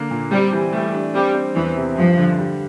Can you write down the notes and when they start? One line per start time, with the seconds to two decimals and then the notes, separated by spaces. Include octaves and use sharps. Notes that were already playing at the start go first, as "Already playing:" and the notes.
Already playing: D3 A#3
0.11 A#2
0.32 G3 C4
0.53 E3
0.73 G3 A3
0.94 D4
1.14 G3 C4
1.34 C4
1.55 E2 E3
1.77 C3
1.97 G2 F3
2.17 D3
2.38 G3